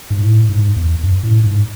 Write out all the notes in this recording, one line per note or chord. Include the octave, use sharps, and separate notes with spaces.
G#2
A2
G#2
E2
F#2
A2
G#2